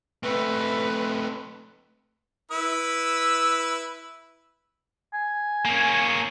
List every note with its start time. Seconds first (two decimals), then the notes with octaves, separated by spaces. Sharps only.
0.23 A3 C4 B4
2.51 E4 B4 E6
5.14 G#5
5.65 A#3 C#4